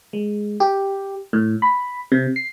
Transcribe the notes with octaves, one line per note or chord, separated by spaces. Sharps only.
G#3
G4
A2
B5
C3
C7